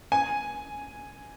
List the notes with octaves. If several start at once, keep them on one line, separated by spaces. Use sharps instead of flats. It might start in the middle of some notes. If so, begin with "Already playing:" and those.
G#5